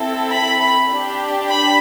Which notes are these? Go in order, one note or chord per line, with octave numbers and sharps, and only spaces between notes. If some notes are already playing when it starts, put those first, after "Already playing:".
Already playing: C4 E4 A4
B5
D4 G4
B5